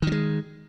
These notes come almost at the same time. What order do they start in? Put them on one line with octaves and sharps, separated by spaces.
D#3 F#3 G#3